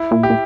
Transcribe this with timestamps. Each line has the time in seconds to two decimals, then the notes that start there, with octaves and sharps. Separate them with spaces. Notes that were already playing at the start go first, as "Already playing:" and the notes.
Already playing: E4
0.11 A#2
0.23 G4
0.30 A#2